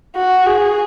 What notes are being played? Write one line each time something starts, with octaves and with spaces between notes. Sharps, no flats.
F#4
G#4